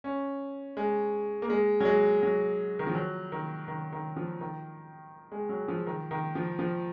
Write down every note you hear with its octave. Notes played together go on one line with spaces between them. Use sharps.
C#4
G#3
A#3
G#3
F#3
G#3
F#3
D#3
F3
F#3
D#3
D#3
D#3
F3
D#3
G#3
F#3
F3
D#3
D#3
F3
F3